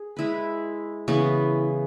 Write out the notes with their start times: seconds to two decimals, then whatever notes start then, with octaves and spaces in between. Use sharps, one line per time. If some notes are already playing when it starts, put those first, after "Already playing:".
Already playing: G#4
0.17 G#3 E4 B4
1.08 C#3 E3 B3